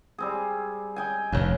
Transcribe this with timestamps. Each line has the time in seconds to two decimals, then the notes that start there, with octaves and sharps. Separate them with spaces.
0.18 G3 C4 G#4
0.96 D#5 G5 G#5
1.32 F1 D#2 C#3